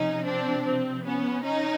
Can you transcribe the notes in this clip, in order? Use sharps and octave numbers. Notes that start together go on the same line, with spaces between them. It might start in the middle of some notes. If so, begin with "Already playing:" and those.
Already playing: C3 F3 C#4 D#4
C4 D4
C4
B3 C#4
C#4 D#4